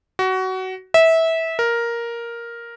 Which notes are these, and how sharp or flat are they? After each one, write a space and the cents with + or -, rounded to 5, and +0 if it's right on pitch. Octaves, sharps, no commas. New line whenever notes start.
F#4 +20
E5 -20
A#4 +5